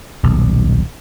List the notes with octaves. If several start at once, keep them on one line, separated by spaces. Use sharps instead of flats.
D#1 B1